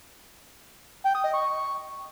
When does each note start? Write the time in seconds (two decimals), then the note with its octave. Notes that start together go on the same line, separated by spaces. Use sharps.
1.05 G5
1.15 D#6
1.24 D#5
1.33 C#6